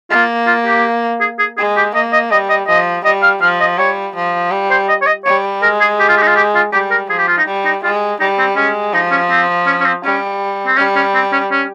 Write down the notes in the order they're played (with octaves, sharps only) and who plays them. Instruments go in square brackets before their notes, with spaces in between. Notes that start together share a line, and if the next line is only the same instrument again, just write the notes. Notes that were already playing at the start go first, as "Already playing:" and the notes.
[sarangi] A#3 [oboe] F4
[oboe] F4
G4
G#4
G#4
[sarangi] G#3 [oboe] G#4
[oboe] G4
[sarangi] A#3 [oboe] D#5
[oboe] D#5
[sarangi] G3 [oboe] D#5
[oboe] D#5
[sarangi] F3 [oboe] D#5
[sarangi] G3 [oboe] D#5
[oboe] F5
[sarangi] F3 [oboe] F5
[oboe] D#5
[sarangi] G3 [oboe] C#5
[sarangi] F3
G3
[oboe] C5
D#5
C#5
D#5
[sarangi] G3 [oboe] C#5
[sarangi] G#3 [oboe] A#4
[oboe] G#4
G4
F4
G4
D#4
F4
G4
F4
[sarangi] G3 [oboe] G4
[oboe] A#4
[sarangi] F3 [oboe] G#4
[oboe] G4
F4
D#4
[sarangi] G3
[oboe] D#4
[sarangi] G#3 [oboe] F4
[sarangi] G3 [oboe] D#4
[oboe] C4
[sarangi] G#3 [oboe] C#4
[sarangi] F3 [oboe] D#4
[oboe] C#4
C4
C#4
C#4
C4
[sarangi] G3 [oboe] C#4
[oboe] C4
[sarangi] G3 [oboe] C#4
[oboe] C#4
C4
C#4
C#4